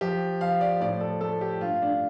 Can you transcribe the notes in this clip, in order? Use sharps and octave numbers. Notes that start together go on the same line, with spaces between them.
F3 G4
F3 F5
D5
A2 D5
A4
A3 A4
G4
G2 F4
D4